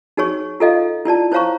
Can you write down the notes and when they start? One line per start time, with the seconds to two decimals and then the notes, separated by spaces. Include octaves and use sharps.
0.17 D#4 F#4 G#4 C#5 C#6
0.60 F4 A4 D#5 F5
1.05 E4 F4 D5 A5
1.32 E4 C5 C#5 F5 A#5 C#6